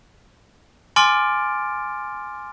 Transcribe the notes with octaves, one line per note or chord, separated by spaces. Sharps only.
G#5 C6 D6 F6 A6 D7